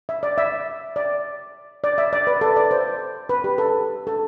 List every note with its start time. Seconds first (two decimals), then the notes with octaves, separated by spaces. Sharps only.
0.09 E5
0.23 D5
0.38 E5
0.96 D5
1.84 D5
1.98 E5
2.13 D5
2.27 B4
2.41 A4
2.56 D5
2.71 C5
3.29 B4
3.44 G4
3.58 A4
4.07 A4